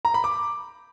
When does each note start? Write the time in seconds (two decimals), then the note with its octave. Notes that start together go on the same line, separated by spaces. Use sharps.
0.05 A#5
0.14 B5
0.24 D6